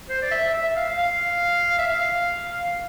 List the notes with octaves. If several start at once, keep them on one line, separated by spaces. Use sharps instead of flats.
C5
D5
E5
E5
F5
F5
E5
F5